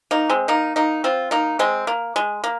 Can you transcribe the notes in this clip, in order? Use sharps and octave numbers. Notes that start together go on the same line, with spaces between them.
A#3 D#4
G#3 C4
A#3 D#4
A#3 D#4
C4 F4
A#3 D#4
G#3 C4
A#3
G#3
A#3